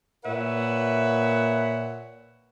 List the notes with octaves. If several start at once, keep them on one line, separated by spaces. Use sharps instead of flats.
A#2 B4 C#5 E5 F#5